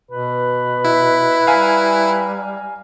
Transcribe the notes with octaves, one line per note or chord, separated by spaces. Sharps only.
B2 B4
E4
G3 F5 G#5 A#5